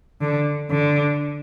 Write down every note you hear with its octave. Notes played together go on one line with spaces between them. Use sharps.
D3
D3